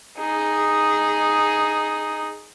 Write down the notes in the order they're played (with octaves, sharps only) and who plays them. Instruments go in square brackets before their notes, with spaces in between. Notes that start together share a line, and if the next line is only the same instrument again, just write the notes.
[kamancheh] D#4 G#4